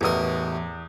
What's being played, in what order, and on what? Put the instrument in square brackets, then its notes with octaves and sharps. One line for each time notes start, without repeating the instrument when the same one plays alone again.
[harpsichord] A1 B2 A#4 [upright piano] E2 D#6